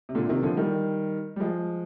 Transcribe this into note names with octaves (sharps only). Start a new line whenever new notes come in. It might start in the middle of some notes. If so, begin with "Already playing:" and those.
C3
A#2 D3
C3 D#3
D3 F3
D#3 G3
G3
F3 G#3